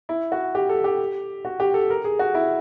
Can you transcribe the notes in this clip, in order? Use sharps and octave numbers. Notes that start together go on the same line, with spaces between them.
E4
F#4
G4
A4
G4
F#4
G4
A4
A#4
G#4
F#4
E4